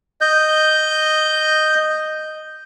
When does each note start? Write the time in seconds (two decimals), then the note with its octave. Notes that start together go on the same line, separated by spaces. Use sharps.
0.21 D#5 G6